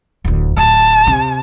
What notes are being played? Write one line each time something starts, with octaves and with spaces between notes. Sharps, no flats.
D1 D2
D1 A5
C3